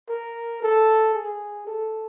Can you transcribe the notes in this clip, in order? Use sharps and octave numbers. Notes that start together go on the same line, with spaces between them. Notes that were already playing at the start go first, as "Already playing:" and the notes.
A#4
A4
G#4
A4